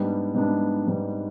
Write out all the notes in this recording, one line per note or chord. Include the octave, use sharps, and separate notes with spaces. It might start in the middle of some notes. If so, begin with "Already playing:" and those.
Already playing: G#2 G3 B3 D4
G#2 G3 B3 D4
G#2 G3 B3 D4